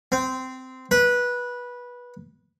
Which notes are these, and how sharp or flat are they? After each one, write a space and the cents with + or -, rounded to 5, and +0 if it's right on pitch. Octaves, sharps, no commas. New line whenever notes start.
C4 -15
B4 -15